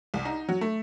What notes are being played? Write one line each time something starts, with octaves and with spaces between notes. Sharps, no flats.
C2
D#4
F#3
A3